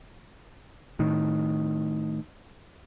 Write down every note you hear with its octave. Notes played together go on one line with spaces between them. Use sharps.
A2 D#3